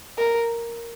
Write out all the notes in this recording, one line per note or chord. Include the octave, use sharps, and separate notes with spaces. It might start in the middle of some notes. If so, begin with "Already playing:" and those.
A#4